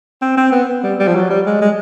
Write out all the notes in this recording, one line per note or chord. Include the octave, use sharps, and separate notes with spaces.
C4
C4
B3
B3
G3
G3
F3
F#3
G3
G#3
G#3